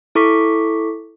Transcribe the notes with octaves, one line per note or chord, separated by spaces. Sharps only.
E4 A4 C#6 D6 B6